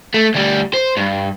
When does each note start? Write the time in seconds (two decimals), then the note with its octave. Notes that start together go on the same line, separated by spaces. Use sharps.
0.14 A3
0.34 D2 G3
0.74 C5
0.97 G2